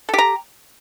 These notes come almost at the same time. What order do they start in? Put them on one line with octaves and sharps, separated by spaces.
A4 G4 A#5